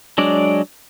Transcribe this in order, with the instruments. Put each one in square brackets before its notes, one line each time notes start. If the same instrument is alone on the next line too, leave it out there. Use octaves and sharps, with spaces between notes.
[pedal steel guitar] F#3 G#3 D4 D5